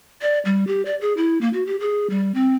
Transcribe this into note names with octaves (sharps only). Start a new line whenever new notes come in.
D5
G3
G4
D5
G#4
E4
A#3
F#4
G4
G#4
G3
C4